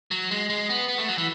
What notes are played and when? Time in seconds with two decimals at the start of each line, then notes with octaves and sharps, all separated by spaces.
0.11 F#3
0.31 G#3
0.50 G#3
0.69 B3
0.88 B3
0.98 A3
1.09 F#3
1.18 E3